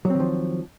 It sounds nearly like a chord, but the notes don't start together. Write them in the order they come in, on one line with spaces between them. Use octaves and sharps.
F#3 C4 D#3 F3